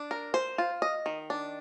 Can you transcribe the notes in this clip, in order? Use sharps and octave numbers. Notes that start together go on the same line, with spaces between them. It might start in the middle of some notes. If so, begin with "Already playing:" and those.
Already playing: D4
A#4
C5
F4
D#5
D#3
D4